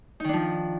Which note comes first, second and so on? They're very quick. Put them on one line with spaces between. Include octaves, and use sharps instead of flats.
D#4 D#3 D4 F3